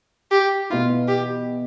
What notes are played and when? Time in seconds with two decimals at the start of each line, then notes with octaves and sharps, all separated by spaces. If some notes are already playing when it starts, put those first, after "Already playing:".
0.31 G4
0.70 B2 B3 E4 F4
1.08 G4